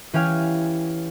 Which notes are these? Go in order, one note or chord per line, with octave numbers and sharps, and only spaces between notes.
E3 C#4 G4 F5 G#5 F6